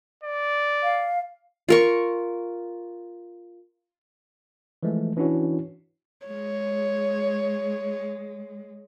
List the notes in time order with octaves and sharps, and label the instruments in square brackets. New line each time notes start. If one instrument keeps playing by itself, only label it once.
[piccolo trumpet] D5
[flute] F5
[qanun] F4 A#4 C#6
[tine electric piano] E3 F3 G#3 A3
E3 C#4 D4 E4 F#4 C#5
[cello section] G#3 [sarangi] C#5